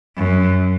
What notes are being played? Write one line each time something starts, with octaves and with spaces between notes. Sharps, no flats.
F#2